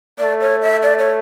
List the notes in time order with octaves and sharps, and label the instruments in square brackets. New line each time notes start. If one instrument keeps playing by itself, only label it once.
[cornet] A3 [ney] D5
[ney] C#5
E5
D5
C#5